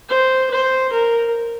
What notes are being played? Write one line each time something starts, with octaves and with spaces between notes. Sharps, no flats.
C5
C5
A#4